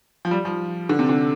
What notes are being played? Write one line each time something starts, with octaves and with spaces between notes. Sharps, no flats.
F3
G3
F3
D3
C3
D3